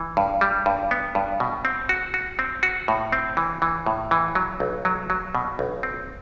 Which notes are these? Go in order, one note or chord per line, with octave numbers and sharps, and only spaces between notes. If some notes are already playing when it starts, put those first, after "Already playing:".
Already playing: E3
G2
G3
G2
B3
G2
B2
C4
F#4
F#4
C4
F#4
A2
C4
E3
E3
A2
E3
F#3
B1
F#3
F#3
B2
B1
C4